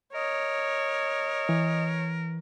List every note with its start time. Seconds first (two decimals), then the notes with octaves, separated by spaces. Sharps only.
0.14 A#4 C#5 D#5
1.49 E3